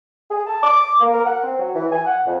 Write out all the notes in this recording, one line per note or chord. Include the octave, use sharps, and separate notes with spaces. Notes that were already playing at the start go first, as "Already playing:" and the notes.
G#4
A5
D6
A#3
A#4
F#5
C4
F#3
E3
G#5
F#5
F2